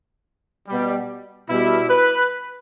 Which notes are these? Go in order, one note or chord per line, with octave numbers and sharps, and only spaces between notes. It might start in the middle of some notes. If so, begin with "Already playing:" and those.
B2 G3
B2 G3 E4
B4